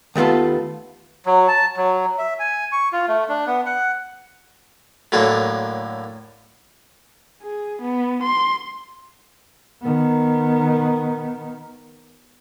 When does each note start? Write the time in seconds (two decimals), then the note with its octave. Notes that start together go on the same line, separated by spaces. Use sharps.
0.16 D#2 A3 B3 F4 A4
1.26 F#3
1.48 A5
1.77 F#3
2.18 E5
2.39 G#5
2.72 C#6
2.93 F4
3.08 A3
3.29 D4
3.47 B3
3.66 F#5
5.12 F#2 A2 D3 A#3
7.43 G#4
7.82 B3
8.23 C6
9.82 D#3 B3